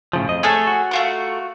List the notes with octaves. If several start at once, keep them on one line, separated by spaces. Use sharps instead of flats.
A2 C#3 F3
F2 D#5
A3 G#4 A4 C#5 G#5
F#4
A3 F4 A#4